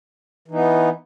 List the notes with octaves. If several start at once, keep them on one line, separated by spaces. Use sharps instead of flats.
E3 B3 D#4